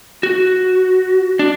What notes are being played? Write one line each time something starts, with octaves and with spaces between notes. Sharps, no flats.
F#4
D4